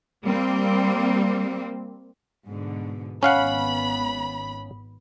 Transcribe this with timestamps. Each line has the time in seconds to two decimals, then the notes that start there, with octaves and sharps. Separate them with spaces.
0.25 G3 A#3 C4
2.47 G#2 B2 D3
3.23 G#1 B3 C#4 F5 F#5 B5